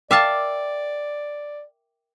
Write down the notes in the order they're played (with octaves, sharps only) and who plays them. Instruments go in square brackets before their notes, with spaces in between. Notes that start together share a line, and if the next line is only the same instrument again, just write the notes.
[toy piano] A#4 G5 D6 [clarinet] D5 [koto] E5 F5 A5